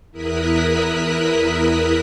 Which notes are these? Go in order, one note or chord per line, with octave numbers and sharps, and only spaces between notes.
E2 E4 A#4 D#6 F#6 B6